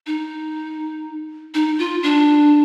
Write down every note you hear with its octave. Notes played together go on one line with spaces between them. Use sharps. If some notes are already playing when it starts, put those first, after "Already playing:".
D#4
D#4
F4
D4